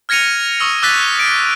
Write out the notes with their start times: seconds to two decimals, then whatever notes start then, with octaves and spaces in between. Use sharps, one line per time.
0.09 F6 G#6 A#6 C#7 D#7 F7
0.60 C#6 D#6 E6 C#7
0.82 D6 E6 F#6 A6 B6 D#7
1.19 D7